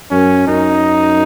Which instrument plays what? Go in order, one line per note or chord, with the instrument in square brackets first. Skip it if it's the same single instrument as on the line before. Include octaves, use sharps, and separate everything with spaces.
[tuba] F#2 [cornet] C#4
[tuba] F#2 [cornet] D#4